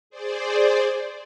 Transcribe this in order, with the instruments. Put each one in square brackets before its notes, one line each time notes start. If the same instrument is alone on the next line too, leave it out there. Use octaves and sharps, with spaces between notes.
[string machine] G#4 C5 D5